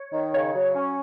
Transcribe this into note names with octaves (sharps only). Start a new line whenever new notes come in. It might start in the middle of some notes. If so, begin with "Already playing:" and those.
Already playing: C#5
D#3
C#3 C#5
F#3
C#4